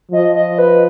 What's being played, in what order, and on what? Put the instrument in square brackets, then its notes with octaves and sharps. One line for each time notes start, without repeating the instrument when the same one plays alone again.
[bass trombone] F3 [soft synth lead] D#5
[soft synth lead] D#5
B4